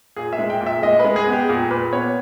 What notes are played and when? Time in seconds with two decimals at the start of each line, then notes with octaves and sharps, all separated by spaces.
0.16 A#2 G#4
0.33 E5
0.38 G#3
0.50 G5
0.61 A#2
0.67 E5
0.82 G#3 D#5
0.99 G#3 B4
1.16 G#4
1.27 B3
1.32 G4
1.49 A#2 G#4
1.70 A#2 B4
1.92 B3 C#5